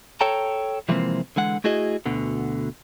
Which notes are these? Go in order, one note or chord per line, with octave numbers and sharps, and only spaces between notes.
A4 C#5 G5 A5 A#5
C3 E3 F3 G#3 A#3 C4
D3 E3 G#3 F#5
A3 E4 F#4 G#4 D#5
D2 B2 D3